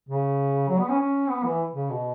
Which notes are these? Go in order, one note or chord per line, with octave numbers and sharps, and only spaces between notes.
C#3
F#3
B3
C#4
C#4
B3
E3
C#3
B2